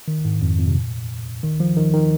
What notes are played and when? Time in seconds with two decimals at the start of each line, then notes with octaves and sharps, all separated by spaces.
0.08 D#3
0.25 G#2
0.42 F2
0.59 F2
0.67 C3
0.76 A#2
1.43 D#3
1.60 F3
1.77 D#3
1.93 D#3